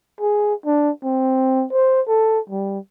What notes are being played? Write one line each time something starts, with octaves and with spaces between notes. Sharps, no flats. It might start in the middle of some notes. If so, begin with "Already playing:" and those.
G#4
D4
C4
C5
A4
G3